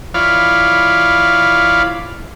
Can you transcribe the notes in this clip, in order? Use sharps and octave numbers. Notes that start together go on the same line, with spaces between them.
E3 F4 C#5 D5 F5 B5